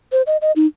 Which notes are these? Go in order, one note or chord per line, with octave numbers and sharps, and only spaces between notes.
C5
D#5
D#5
D#4